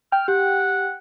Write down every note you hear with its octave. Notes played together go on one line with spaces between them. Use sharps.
G5 F6
G4 F#5